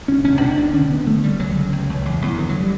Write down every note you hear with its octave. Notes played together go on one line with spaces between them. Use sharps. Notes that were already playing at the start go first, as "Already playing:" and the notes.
C#2 C#4
C#2 C#4
B2 D4
C#2 D4
D3 C#4
D2 B3
D3 A3
D2 G3
C#2 F#3
C#3
C#2
C#2
E2
E2
D3 E3
F#3
G3